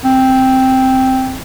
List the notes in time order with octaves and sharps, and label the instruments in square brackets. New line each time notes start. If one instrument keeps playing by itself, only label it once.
[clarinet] C4